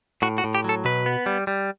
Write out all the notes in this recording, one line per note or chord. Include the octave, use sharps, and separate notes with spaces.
A2 F#4
F#4
A2
G4
F#3 A4
B2 B4
B3
G3
G3